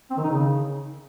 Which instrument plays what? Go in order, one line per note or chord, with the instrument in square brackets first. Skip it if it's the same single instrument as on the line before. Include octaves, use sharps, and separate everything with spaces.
[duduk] C4
D#3
D#4
C#3